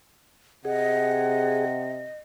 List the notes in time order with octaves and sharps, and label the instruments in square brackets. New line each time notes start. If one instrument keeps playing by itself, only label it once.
[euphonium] C3 [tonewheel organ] G#4 [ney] D#5 [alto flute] F#5